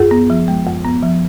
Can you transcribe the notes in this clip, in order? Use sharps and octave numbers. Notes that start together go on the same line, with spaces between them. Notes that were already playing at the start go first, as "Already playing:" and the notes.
Already playing: F#2 F4 G#4
B3
F3
G#3
F#2
B3
F3